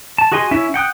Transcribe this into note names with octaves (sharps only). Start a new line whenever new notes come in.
A5
F#4 G#4 D#5 G#5 C6
C#4 E4 E5
F#5 G5 D#6 F#6